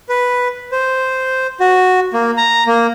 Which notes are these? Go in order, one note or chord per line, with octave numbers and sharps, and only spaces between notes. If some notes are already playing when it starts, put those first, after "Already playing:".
B4
C5
F#4
A#3
A#5
A#3